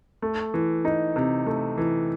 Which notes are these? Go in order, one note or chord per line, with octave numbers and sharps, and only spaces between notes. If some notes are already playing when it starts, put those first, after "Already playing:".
A3
E3
D#4
C3
A3
E3